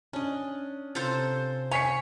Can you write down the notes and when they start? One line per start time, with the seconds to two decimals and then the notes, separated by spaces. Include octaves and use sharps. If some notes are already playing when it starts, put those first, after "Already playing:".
0.13 C#4 D4 D#5
0.95 C3 F4 A4 C5 A#5
1.71 C#5 G5 G#5 B6 C#7